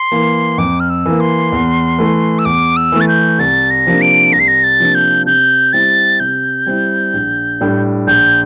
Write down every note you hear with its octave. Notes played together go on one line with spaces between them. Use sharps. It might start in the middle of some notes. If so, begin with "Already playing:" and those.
Already playing: C6
E3 A#3
F2 D6
F6
E6
E3 A#3
C6
E2
E3 A3
E6
E2 D6
E6
E3 A3
A6
G6
C2 A6
A#6
C3 F3 A#3 D4
D7
C2 A#6
C7
A#6
A6
C3 F3 A#3 D4
G6
C3 G6
G3 C4 E4 A6
C3 G6
G3 C4 E4
A#1
A2 G3 D4
A#1 G6